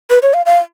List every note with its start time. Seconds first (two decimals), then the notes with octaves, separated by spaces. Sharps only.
0.10 B4
0.22 C#5
0.34 F5
0.46 F5